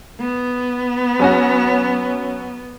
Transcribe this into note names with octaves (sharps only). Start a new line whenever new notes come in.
B3
F#3 C#4 F#4